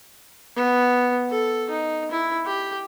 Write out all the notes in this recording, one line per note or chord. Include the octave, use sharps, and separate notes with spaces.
B3
A4
D#4
E4
G4